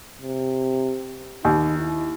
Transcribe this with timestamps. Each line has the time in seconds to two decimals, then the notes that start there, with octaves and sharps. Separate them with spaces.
0.22 C3
1.45 D#2 D#4
1.78 E4